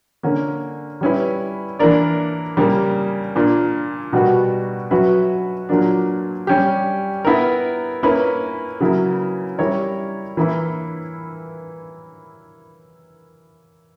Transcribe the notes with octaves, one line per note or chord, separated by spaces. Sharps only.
D3 A#3 C#4
G3 C#4 E4 B4
E3 A#3 D4 A#4 D5
C#3 G3 A#3
A#2 A#3 D4
B2 G3 B3 F#4 A#4
F#3 C#4 F#4 B4 E5
A#2 F#3 A#3 D4
G3 C#4 G4
B3 E4 A#4
A#3 C#4 E4 B4
C#3 F#3 A#3 E4
G3 C#4 E4 A#4 C#5
E3 A#3 E4 B4